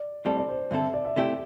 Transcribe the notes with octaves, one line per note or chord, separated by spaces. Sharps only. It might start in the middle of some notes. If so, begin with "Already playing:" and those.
Already playing: D5
A2 G3 C4 A4 D5
D5
C5
G2 D3 C4 A4 E5
D5
E5
C3 A3 E4 G4 D5